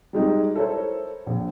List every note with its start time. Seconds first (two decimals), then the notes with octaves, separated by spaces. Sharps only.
0.13 G3 G#3 D#4
0.55 E4 A4 A#4 C5 C#5
1.26 A#1